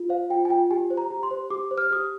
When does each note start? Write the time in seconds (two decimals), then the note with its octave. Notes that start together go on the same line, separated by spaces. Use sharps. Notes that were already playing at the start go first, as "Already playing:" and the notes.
Already playing: F4
0.09 C5 F5
0.30 F4 G5
0.45 G#5
0.49 F4 G5
0.71 G4 G#5
0.90 C5
0.97 A#5
1.10 G4
1.23 C6
1.31 C5
1.50 G4 D6
1.71 C5
1.78 F6
1.91 G4 D#6